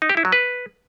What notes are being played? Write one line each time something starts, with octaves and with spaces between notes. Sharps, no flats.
D#4
G4
E4
F#3
B4